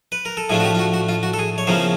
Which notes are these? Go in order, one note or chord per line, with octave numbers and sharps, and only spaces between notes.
B4
A#4
A4
A2 F3 A3 D4 F4 G#4
F#4
G4
F4
F#4
F#4
F4
F#4
A4
G#4
C#5
E2 C#3 F3 A#3 C#4 C5